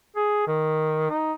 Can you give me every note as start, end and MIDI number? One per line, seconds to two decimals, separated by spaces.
0.16 0.47 68
0.47 1.09 51
1.10 1.33 63